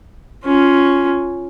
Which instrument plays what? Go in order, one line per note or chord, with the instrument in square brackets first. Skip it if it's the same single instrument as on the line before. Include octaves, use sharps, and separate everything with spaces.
[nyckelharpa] C#4 F4